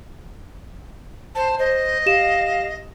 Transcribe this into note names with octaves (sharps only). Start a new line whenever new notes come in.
C5 A5
C5 D#5
G4 F5 E7